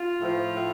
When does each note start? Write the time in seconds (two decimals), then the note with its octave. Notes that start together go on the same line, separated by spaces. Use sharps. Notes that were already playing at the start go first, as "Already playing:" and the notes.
Already playing: F4
0.20 A2 F3
0.54 A2